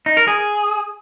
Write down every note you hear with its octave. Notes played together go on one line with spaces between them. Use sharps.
D#4
A#4
G#4